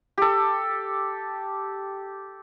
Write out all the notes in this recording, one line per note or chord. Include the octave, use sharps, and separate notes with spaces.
G4 A4